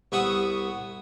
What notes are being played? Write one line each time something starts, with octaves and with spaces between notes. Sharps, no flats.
C2 B3 E5 F#5 C#6 D#6